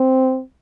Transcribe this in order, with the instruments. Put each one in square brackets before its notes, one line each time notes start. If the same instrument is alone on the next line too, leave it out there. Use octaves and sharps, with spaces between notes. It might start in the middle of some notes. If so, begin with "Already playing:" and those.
Already playing: [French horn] C4